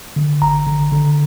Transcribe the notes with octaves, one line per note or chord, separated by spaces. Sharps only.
D3
G1 A#5
D3
D3